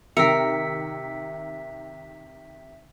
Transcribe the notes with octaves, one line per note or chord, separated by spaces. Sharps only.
C3 D#3 A#4 E5 E6 B6 C#7